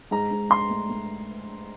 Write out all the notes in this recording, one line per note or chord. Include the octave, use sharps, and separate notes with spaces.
G#2 A#5
G#2
G#2 C6
A3
A3